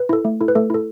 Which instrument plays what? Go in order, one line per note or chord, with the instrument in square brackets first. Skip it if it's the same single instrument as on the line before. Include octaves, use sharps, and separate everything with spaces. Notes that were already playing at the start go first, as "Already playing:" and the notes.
Already playing: [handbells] B4
E4 A4
A3
E4 A4
B4
A3 A4
E4 A4